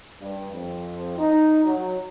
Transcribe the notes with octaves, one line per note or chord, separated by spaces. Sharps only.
G2
F2
D#4
F#3